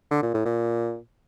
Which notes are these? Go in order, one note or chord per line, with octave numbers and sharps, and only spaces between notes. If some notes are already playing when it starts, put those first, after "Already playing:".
D3
A#2
A2
A#2